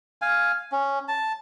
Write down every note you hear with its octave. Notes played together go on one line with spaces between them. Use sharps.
F5 G#5
C#4
A5